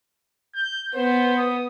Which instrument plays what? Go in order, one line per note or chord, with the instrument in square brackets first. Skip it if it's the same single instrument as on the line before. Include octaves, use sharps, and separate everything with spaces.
[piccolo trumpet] G6
[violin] B3 [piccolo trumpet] C5
[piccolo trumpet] D#6